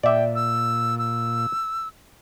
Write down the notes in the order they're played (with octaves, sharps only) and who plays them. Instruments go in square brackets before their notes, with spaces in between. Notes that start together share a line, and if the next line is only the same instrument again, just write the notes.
[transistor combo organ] A#2 [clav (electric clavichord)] D5 E5 [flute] G5
[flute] E6
E6